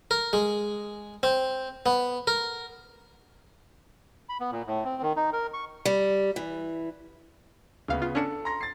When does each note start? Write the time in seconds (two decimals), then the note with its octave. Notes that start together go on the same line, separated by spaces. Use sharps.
0.11 A#4
0.33 G#3
1.23 C4
1.86 B3
2.27 A#4
4.29 B5
4.40 B3
4.52 A#2
4.67 A2
4.84 C4
5.02 D#3
5.16 D#4
5.33 A#4
5.53 C#6
5.85 G3
6.36 E3
7.88 D2 C#3 B3 F5
8.02 F4
8.15 C#4 D4 A4 C#7 E7
8.45 A#5 C6 A#6
8.61 A6 C7